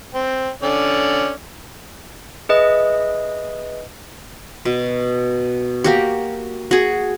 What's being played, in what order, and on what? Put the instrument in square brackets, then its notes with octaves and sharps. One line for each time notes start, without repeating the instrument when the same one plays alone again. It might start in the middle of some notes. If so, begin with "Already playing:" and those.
[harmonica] C4
D3 C#4 D5
[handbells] G#4 B4 D#5 E5
[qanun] B2
A#3 F#4 G4
F#4 G#4